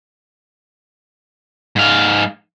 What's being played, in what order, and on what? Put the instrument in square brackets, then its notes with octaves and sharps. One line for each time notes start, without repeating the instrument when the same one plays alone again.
[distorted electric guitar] G#2 F5